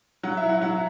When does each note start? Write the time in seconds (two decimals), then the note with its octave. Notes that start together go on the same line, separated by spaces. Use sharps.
0.23 F#3 F#5
0.37 E5
0.44 E4
0.49 F#5
0.61 F#3 F#5